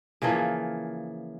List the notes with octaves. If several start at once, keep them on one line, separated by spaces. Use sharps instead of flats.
C#3 E3 F3 A#3